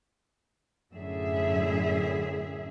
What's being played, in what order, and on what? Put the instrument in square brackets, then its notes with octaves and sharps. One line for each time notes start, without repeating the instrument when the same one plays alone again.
[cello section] F#2 A2 D3 G#4 E5